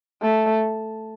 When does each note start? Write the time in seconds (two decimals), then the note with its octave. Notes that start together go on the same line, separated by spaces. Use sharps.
0.22 A3